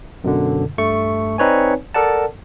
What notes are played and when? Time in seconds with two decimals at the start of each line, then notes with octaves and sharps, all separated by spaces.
0.24 F#2 B2 D3
0.78 G2 A3 C#6
1.38 C4 D#4 B4 C#5 D5 G#5
1.94 A4 A#4 D5 F#5 A5